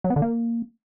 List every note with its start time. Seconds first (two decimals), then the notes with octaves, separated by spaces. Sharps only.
0.04 F#3
0.10 B3
0.16 D3
0.22 A#3